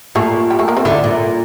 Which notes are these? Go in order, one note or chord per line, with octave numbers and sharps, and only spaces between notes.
A#2 A3 A4
G3 G4
A3 A4
A#3 A#4
C4 C5
D3 E4 E5
A#2